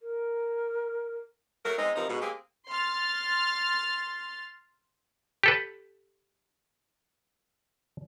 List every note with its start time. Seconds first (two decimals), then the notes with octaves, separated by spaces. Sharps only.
0.02 A#4
1.65 F#3 A3 A#4
1.78 G#3 B3 C4 D#4 D#5
1.96 C3 E3 F3 D#4 A#4
2.09 G#2 B2
2.22 G#3 A#3 C4 G4 G#4
2.70 C6 F6 A6
5.44 G4 A4 B4